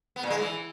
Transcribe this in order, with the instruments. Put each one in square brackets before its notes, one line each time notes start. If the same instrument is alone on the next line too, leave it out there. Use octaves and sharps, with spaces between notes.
[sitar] B3
A#2
G#3
E3